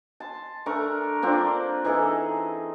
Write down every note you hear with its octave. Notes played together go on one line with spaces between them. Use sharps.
A5 C6
A3 D4 A#4 C#6
A#3 C4 D4 F4
E3 D#4 G#4 A4